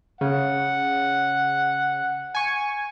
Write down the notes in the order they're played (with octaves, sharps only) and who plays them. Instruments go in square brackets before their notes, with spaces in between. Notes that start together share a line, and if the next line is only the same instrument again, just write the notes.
[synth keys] C#3 [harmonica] F#5
[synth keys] G#5 C#6